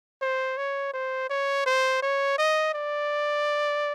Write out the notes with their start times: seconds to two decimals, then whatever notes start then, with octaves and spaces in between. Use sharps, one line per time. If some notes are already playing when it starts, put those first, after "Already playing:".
0.22 C5
0.57 C#5
0.93 C5
1.30 C#5
1.66 C5
2.02 C#5
2.38 D#5
2.74 D5